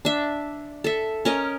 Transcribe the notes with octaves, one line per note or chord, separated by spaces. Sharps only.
D4 E5
A4 E5
C#4 A#4 D#5